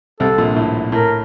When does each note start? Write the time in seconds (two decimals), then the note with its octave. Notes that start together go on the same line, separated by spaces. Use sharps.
0.20 C2 C3 A4
0.38 A#1 A#2
0.56 A2
0.92 A2 A#4